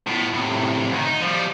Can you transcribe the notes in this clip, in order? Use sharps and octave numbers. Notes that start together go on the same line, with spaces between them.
A2 B3
A2 C3
D2 D#3
D#4
F3 G3